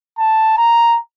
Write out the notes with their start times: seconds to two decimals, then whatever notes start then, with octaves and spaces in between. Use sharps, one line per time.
0.19 A5
0.57 A#5